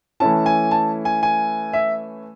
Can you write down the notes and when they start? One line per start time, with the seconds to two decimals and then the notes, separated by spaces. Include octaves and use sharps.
0.20 E3 A3 C#4 E4 A5
0.46 G#5
0.71 A5
1.05 G#5
1.23 G#5
1.73 E5